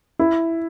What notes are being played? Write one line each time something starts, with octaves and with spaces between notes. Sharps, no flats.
E4